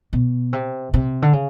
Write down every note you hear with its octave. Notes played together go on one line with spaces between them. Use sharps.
B2
C3
C3
D3
C#3